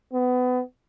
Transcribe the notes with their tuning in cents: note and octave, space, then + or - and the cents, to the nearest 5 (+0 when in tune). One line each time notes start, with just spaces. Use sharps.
B3 +25